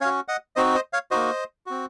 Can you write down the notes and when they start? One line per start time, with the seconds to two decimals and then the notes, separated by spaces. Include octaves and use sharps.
0.01 C#4 C#5 F5
0.05 F#4
0.28 D#5 F#5
0.56 C4 D#4 F#4 C5 D#5
0.75 C5 D#5
0.93 C#5 F5
1.11 A#3 D#4 F#4 C5 D#5
1.66 C4 F#4